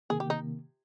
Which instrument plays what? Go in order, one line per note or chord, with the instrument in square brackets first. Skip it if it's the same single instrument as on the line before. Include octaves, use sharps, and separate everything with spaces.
[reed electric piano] C3 D#3 A#3 [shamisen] G#4
[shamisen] G4
D#4